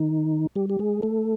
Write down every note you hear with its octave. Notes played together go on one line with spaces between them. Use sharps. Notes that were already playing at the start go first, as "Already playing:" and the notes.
Already playing: D#3 D#4
G3 G4
G4
G#3 G#4
A3 A4